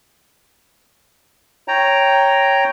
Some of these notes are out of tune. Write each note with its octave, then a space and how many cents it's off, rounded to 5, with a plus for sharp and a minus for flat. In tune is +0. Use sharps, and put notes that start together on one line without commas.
C#5 +0 G5 +0 A#5 +0